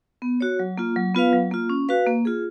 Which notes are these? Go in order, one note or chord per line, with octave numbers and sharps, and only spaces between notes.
B3
F#4 C#5
F#3
A#3 F4
F#3
B3 F4 B4 F5
F#3
A#3 F4
C#4
F#4 B4 F5
A#3
F4 G#4